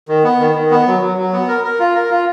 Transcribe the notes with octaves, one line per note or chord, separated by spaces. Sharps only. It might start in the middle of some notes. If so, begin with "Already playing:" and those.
D#3
B3
D#3
D#3
B3
F#3
F#3
F#3
B3
A#4
A#4
F4
A#4
F4